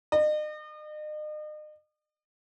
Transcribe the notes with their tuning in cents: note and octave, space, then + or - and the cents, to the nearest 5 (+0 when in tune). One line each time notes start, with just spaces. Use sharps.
D#5 -40